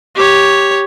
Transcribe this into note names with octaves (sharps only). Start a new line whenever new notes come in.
G4 C#5